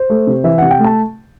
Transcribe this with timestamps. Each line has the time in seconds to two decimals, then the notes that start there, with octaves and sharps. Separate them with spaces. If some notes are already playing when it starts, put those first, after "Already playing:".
Already playing: C5
0.10 A3
0.27 C3
0.44 E3 E5
0.58 C3 F#5
0.71 G5
0.79 A3
0.84 A5